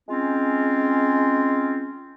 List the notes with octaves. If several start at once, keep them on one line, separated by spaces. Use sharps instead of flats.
G#3 C4 C#4 F4